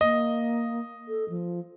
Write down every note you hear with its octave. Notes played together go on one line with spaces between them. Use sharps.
A#3 D#5
A4
F3